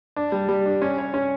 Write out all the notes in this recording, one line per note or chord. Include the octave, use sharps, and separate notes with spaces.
D4
G3
G3
D4
C#4
C#5
C#4